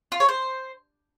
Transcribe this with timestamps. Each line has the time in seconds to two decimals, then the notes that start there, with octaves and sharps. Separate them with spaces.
0.12 F4
0.20 C#5
0.29 C5